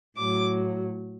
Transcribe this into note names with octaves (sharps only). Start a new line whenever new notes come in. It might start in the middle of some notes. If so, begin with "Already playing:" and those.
A2 F#3 D6